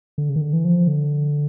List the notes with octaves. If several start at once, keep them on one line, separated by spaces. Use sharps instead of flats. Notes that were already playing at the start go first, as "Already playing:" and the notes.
D3
C#3
D#3
D3
E3
F3
D3